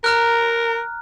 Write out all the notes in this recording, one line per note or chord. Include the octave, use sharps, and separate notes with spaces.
A#4 A#5 F6 F#6